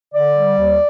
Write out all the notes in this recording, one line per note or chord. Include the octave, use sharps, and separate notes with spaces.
D3 D5
G3
D#2